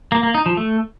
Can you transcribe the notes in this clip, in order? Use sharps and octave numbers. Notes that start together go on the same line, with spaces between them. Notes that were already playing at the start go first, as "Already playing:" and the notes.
A#3
A#3
D#4
F3
A3